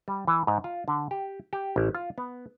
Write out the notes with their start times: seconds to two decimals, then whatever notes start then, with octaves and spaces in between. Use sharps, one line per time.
0.08 G3
0.27 E3
0.47 G#2
0.64 F4
0.88 D3
1.11 G4
1.53 G4
1.76 A1
1.95 F4
2.18 B3